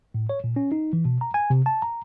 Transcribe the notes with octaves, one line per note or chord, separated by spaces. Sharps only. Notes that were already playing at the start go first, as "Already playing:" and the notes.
A2
C#5
A#2
C#4
D#4
E3
B2
A#5
G#5
C3
A5
A#5